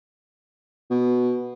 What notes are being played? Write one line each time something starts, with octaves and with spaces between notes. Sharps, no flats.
B2